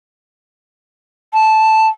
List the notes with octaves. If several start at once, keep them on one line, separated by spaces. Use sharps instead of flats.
A5